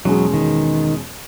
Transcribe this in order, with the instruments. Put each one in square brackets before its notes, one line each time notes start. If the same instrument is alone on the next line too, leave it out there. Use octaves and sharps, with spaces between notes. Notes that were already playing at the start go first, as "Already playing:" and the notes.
[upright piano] E2 B2 G#3 C#4 G#4 [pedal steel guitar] F#3
[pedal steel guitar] D#3